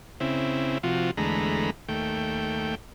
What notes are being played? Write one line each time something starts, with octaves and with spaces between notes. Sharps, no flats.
C#3 C4 E4
C3 F3 F4 F#4
E2 D3 G#3 A3 A#5 B5
D#2 A3 G5